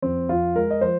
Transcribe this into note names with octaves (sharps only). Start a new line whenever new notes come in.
F2 C4
F2 F4
G#3 A#4
D#5
F3 C5